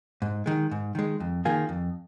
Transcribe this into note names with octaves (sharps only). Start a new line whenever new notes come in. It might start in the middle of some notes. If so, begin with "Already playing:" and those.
G#2
D#3 G#3
G#2
D#3 G#3
F2
D#3 A#3 F4 G#4
F2